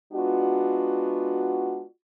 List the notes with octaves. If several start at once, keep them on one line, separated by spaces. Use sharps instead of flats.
G#3 B3 D4 F4 F#4